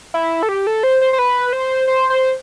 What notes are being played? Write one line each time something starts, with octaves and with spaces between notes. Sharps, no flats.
E4
A4
G4
A4
C5
C5
C5
B4
C5
C5
C5